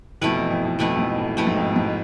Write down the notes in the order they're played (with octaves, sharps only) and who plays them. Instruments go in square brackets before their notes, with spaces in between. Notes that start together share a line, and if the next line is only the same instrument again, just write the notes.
[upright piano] F2 [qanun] B2 A3 E4 B4
[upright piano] E2
F2
F2
[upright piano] F2 [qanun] B2 A3 E4 B4
[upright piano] F2
G#2
A2
[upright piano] F2 [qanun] B2 A3 E4 B4
[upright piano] G#2
F2
G#2